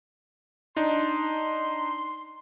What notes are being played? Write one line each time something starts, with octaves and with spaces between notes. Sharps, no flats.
D4 D#4 C6